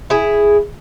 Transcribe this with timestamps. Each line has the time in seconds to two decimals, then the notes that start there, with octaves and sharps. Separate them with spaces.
0.10 E4 G#4